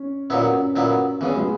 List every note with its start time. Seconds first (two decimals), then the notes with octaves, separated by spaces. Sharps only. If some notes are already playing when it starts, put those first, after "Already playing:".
Already playing: C#4
0.29 A#2 F#3 B3 C#4 E4
0.52 C#4
0.76 A#2 F#3 B3 E4
1.21 E2 C#3 E3 B3
1.37 G#3